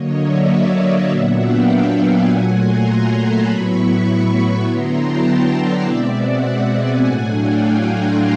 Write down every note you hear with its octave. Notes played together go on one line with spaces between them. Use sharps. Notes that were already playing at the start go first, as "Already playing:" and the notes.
Already playing: D3 F#3 A#3 C#5 D#5
D5 E5
D#5 F5
A#2 F#3 B3 D4 E5 F#5
F5 G5
F#5 G#5
A#2 F#3 A3
A#5 C6
A5 B5
A2 F#3 B3 E4 B5 C#6
B5 C#6
D3 F#3 B3 E4 A#5 C6
G5 A5
D5 E5
B2 G#3 C4
E5 F#5
F#5 G#5
A2 F#3 A3 D4
F5 G5
F#5 G#5
A#5 C6